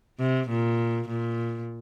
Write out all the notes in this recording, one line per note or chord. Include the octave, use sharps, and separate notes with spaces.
C3
A#2
A#2